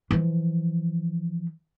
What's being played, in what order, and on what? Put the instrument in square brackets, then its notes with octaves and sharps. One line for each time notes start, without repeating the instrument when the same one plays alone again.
[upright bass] E3 F3